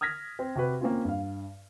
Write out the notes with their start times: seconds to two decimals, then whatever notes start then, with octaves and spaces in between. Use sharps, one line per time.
0.01 D#6 F6 G#6 A#6 B6
0.39 C4
0.55 C3 F#4 G4 B4
0.81 A#3 C4 C#4 F4
1.05 G2 F5